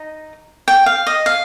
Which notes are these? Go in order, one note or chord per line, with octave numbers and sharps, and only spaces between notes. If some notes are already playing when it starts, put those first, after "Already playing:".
Already playing: D#4 D#5
G5
F5
D#5
F5